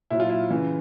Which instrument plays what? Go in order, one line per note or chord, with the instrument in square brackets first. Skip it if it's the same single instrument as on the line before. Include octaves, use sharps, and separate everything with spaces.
[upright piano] A#2 F#3 E4
F4
E4
C#3 E3